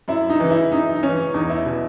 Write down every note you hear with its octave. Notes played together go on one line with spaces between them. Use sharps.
F#2 E4
D#4
C#3 E3
E4
F#2 D#4
D#4
C#3 E3 C#4
E2 D#4
E4
B2